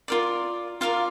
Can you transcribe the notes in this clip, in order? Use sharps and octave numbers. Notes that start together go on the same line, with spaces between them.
F4 A#4 D5
F4 A#4 D5 F5